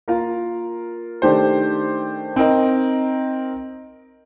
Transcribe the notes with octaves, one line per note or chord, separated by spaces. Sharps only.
A#3 F4 A#4 F5
D#3 A3 D4 G4 C5
C4 D#4 A#4 D#5